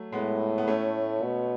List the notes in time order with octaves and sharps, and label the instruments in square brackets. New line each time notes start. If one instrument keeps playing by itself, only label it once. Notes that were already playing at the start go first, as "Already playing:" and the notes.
Already playing: [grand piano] F#3 A3
[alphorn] A2 [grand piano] G#3 B3
[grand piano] B3
A3 C#4
[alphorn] B2